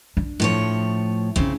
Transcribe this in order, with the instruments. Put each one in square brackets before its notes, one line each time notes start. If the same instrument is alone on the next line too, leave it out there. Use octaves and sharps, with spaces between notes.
[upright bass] D4
[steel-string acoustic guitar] A2 F3 C#5
[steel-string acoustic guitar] C#3 C4 [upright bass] D#4 E4